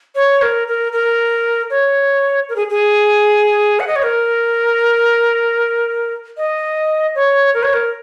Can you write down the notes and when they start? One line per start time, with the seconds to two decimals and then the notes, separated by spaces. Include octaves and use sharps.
0.15 C#5
0.42 A#4
0.68 A#4
0.92 A#4
1.70 C#5
2.49 A#4
2.56 G#4
2.70 G#4
3.80 F#5
3.88 D#5
3.96 C#5
4.04 A#4
6.37 D#5
7.15 C#5
7.54 A#4
7.63 C#5
7.73 A#4